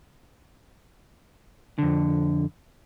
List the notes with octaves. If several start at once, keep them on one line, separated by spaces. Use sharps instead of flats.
F2 D3